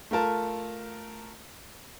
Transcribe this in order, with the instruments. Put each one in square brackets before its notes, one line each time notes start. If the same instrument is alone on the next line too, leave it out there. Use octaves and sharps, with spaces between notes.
[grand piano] A3 F4 A#4 A5